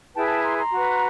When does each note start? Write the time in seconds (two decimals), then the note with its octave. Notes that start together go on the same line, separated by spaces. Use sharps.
0.14 E4 G#4 B4 G5 A5
0.28 G5 A5
0.43 A#5 C6
0.58 A#5 C6
0.71 F#4 B4